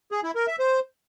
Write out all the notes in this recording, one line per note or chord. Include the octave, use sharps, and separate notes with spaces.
G#4
E4
A#4
E5
C5